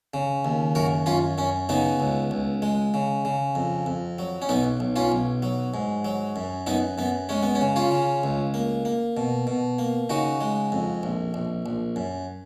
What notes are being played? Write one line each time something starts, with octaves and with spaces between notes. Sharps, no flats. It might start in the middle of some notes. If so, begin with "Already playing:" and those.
C#3
D#2
F#2 F#4 A#4
F#2 C#4 F4
F#2 C#4
C#3 B3 D#4
C#2
C#2
G#3
C#3
C#3
F2
F2
F#3
C#4
B1 B3 D#4
B1
C#4 F4
B1
F#3
G#2
F#3
F#2
F#2 B3 D#4
F#2 B3
G#3 C#4
B3
C#4
C#3
C#4 F4
C#3
C#2
A#3
A#3
B2
B2
A#3
C#3 D#4 F#4
G#3
F2
A#1
A#1
A#1
F#2